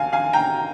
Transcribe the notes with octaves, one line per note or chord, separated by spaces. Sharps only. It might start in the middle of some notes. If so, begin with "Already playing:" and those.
Already playing: D#2 F5 G#5
F5 G#5
G5 A#5